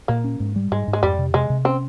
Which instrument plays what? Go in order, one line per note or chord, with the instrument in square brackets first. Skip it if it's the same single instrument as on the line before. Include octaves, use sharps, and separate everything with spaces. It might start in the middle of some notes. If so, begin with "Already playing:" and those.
[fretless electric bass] A#2 [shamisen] A#3
[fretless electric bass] C#4
G#2
G3
[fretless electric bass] G#2 [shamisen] G#3
[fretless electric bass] G#2
[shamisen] G#3
[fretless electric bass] F2 [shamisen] G3
[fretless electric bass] C3
[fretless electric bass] C3 [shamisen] G#3
[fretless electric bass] C3
[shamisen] C4 [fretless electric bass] C#4